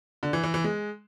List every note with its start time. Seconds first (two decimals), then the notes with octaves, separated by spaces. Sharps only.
0.23 D3
0.33 E3
0.44 E3
0.54 E3
0.64 G#3